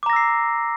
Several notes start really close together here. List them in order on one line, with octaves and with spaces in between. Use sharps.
D6 A#5 A#6 E6 C7